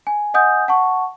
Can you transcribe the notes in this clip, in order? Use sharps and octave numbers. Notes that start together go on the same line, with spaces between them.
G#5
D#5 F#5 G#5 D#6 G6
F#5 A5 C#6